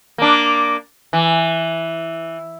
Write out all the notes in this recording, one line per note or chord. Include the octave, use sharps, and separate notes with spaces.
A#3 D4
E3